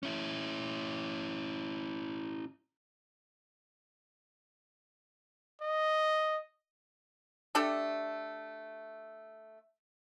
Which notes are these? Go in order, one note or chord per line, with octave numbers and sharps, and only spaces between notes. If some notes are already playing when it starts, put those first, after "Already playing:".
C#4 E4
D#5
A3 D4 G4 A4